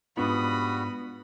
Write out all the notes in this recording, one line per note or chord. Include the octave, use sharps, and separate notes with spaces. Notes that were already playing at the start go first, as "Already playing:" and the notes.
G#2 G3 B3 D4 F4 F#4 B5 D#6